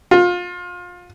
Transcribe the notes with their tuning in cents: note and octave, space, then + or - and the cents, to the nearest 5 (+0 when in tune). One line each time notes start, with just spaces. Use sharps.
F4 +25